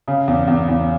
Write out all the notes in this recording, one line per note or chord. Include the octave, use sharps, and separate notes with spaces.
C#3
E2
E2
E2